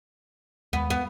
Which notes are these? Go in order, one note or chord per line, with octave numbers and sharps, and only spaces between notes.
D#2 G#3 B3
B3